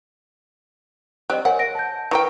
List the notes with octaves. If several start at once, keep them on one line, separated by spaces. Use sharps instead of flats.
G3 C4 D#5 F#6
A#4 C#5 F#5 G#5
A#6 D7
A5 G6
E3 A#4 G5 C#6